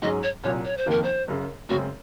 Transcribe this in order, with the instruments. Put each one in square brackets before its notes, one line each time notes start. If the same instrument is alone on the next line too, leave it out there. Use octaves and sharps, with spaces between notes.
[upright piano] G#2 F#3 C#4 G#4 [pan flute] D#5
[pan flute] C#5
[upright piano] C2 A#2 F#3 [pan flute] C#5
[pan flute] C#5
C5
[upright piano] F#1 F2 D#3 A#3 D#4 [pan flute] A#4
[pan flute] C5
[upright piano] F#1 F#2 C#3
[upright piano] F#2 C#3 G#3 C4 [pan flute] F#4